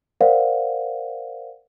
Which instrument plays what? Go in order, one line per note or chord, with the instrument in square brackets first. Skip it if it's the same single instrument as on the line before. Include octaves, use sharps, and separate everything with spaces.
[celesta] A#4 C5 D5 F5 F#5